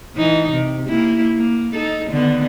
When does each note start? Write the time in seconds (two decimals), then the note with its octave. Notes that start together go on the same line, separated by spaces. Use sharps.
0.16 E3 D#4
0.52 C3
0.88 A#3 E4
1.35 A#3
1.74 D#4 A4
2.09 D3 D#3 B3